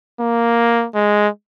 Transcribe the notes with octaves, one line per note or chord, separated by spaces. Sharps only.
A#3
G#3